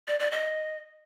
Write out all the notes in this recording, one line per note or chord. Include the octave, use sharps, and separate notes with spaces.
D5
D5
D#5